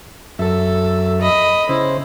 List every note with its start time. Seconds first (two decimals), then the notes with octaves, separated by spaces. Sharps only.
0.39 F#2 A4 E5
1.21 D#5 B5
1.69 C#3 E4 C5